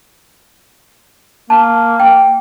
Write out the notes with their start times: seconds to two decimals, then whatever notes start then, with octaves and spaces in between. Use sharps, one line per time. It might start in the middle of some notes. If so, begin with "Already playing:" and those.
1.50 A#3 A5
2.00 G5